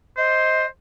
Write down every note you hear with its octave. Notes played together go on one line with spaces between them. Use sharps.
C5 D#5